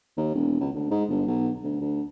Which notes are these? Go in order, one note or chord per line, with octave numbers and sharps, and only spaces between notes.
D#2
E1
C#2
D2
G#2
G1
B1
D2
D2